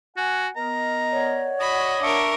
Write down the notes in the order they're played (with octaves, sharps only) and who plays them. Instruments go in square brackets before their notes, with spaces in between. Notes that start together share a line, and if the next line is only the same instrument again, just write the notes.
[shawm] F#4 [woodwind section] F#5 G#5
[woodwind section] B3 A#4 D#5 [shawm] A#5
[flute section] C#5 D5 F#5
[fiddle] F#4 B5 [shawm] D#5
[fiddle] D4 A#4 [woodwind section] E5 C#6 D6